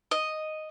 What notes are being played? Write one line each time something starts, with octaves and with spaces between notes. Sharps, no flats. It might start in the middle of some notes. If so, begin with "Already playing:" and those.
D#5